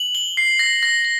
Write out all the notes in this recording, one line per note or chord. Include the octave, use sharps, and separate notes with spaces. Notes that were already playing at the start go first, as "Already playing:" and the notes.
Already playing: F#7
G7
C7
A#6
A#6
A#6